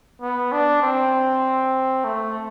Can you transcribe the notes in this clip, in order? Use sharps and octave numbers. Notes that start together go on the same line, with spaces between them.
B3
D4
C4
A3